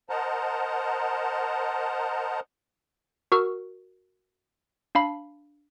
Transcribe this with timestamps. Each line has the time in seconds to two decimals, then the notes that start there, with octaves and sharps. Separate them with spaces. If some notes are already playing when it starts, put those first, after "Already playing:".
0.10 A#4 C5 D#5 F#5 A5 A#5
3.32 F#4 A#4 C#6 E6 F6
4.95 D4 F5 B5